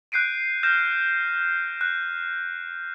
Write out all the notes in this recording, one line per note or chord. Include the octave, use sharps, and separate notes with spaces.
F#6 G6 C7 D7 D#7
F6 G6 A#6 E7
F#6